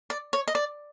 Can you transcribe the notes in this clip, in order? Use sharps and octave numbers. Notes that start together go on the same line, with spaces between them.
D5
C#5
D#5
D5